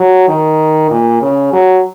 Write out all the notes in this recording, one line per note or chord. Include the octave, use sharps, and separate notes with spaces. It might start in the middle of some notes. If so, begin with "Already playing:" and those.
Already playing: F#3
D#3
A#2
C#3
F#3